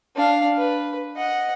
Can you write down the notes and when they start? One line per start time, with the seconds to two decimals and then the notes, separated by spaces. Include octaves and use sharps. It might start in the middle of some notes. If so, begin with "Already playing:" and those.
0.16 D4 F5
0.58 B4
1.17 D#5 F#5